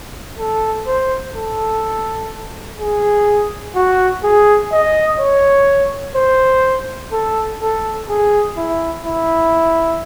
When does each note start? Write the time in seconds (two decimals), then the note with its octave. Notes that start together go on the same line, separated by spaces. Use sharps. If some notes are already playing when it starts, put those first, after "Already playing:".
0.39 A4
0.87 C5
1.36 A4
2.79 G#4
3.75 F#4
4.24 G#4
4.73 D#5
5.20 C#5
6.16 C5
7.12 A4
7.62 A4
8.09 G#4
8.57 E4
9.06 E4